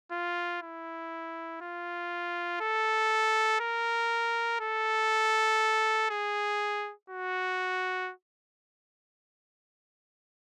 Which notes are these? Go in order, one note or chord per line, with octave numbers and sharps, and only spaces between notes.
F4
E4
F4
A4
A#4
A4
G#4
F#4